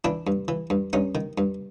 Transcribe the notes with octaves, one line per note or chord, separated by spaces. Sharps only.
E3 D4 E4
G2
E3
G2
G2 C#4 D#4
D#3
G2